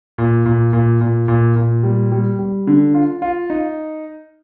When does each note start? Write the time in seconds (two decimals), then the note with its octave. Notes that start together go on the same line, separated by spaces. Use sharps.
0.18 A#2
0.46 A#2
0.73 A#2
1.01 A#2
1.28 A#2
1.56 A#2
1.83 G3
2.12 G3
2.39 G3
2.67 D3
2.94 F4
3.22 F4
3.50 D#4